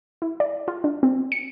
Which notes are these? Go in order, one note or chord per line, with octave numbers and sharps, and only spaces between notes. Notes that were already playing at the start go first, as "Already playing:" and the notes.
E4
D5
F4
D4
C4
C#7